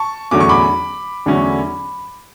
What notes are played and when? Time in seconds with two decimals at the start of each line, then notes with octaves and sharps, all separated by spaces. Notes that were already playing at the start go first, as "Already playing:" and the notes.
Already playing: A5 C#6
0.31 E2 D3 F#3 A3 C#4 D6
0.40 C#6
0.49 B5 D6
1.26 E2 D3 F#3 A3 C#4